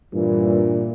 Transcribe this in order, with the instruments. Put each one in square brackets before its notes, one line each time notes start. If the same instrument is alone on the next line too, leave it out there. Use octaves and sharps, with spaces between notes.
[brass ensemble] G2 E3 [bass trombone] A#2